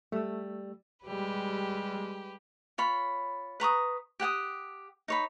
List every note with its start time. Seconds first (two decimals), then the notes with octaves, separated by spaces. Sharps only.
0.12 G3 A3 E6
1.06 G3 G#3 G4 B4
2.78 F4 C#5 B5
3.60 B4 A#5 C#6 D#6
4.20 G4 F#5 G5 D#6
5.08 D#4 C#5 B5